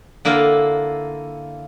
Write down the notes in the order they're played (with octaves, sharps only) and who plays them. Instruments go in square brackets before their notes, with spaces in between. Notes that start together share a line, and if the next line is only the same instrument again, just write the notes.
[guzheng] D3 A#3 E4 F4 F5